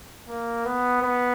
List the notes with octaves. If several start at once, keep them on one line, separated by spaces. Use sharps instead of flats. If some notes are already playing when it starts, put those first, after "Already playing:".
A#3
B3
B3